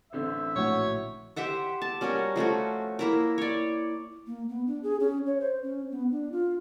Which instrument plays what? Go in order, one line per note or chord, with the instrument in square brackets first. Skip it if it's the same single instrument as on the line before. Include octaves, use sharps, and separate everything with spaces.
[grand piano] A1 D3 C4 [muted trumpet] E5
[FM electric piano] A#1 A2 F#4 [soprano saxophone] C#5
[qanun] G4 C5 E5 F#5
A5
G3 C#4 F#4 A#4
F3 A3 C#4 F#4
A#3 E4 A#4
C#5 D5
[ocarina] A#3
B3
D4
G#4
C#4
C#5
C5
C#4
B3
D4
F4